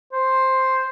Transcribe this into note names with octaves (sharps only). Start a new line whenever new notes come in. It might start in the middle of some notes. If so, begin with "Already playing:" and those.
C5